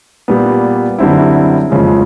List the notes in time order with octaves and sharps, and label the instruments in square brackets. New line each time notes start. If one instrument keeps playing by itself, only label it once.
[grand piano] A#2 G3 B3
F#2 D3 G3 C4 E4
F#1 F2 C#3 F3 G#3